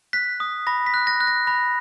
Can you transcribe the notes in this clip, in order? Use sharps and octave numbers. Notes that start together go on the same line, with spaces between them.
F#6 B6
D#6
B5 A#6
B6
F#6
A#6
F#6
A#6
B5 A#6